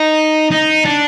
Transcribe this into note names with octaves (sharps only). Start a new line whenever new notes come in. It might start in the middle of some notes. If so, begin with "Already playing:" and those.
Already playing: D#4
D#4
D4